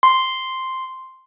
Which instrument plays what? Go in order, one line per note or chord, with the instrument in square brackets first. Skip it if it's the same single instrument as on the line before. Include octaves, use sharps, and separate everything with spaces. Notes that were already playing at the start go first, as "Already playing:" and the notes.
[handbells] C6